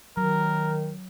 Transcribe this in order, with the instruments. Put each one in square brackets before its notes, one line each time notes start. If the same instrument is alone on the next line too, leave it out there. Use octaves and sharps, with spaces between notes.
[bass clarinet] D#3 [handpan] F#3 [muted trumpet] A#4